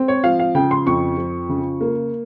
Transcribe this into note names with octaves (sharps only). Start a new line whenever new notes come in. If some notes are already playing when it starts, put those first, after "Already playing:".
Already playing: C4
C#5
F3 F5
F5
C#3 G5
C6
F2 C#6
F3
C#3
A#3